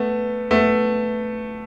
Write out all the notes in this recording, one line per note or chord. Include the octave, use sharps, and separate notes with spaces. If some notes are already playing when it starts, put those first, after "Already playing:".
Already playing: A3 B3
A3 B3